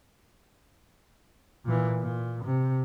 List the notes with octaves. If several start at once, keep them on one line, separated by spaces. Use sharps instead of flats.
A#2 E3
A#2
C3